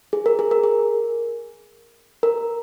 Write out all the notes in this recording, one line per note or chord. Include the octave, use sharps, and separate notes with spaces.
G#4
A#4
G#4
A#4
G#4
A#4